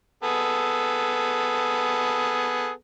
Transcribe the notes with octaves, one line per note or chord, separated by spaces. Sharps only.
B3 G#4 A4